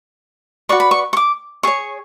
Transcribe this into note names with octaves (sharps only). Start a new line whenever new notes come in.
F#4 B4 D5 C#6
B5
C#6
C#6
D6
G#4 C#5 C#6